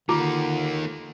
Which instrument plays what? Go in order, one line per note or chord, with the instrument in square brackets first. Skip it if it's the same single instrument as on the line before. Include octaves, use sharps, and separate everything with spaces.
[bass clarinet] D3 [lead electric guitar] D#3 A#3 [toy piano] F4 A#5 D6